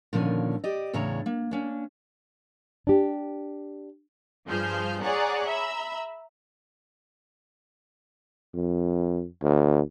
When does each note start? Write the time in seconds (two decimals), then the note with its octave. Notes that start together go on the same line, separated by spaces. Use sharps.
0.13 A#2 D3 D#3 F3 C#4
0.64 G4 D5 D#5
0.93 E2 A2 C#3 D4 C#5 A#5
1.26 A#3
1.51 A#3 C#4 D4
2.87 D4 G4
4.47 G2 F3 G#4 C5 F6 G6
5.02 G#4 C#5 D5 F#5 A#5 F#6
5.47 E5 A#5 B5 E6
8.54 F2
9.42 D2